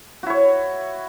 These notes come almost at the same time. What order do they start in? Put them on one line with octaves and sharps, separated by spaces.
F#4 E4 C#5